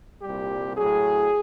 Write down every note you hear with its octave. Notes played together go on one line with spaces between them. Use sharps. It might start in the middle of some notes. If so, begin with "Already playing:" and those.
C2 A#2 G3 G4
A2 F#3 G#4